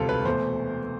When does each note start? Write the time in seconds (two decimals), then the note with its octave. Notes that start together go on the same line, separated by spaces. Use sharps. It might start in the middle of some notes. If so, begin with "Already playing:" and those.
Already playing: E1 D2 C3 G3 F4 A4
0.09 B4
0.25 E2 B2 A3 C5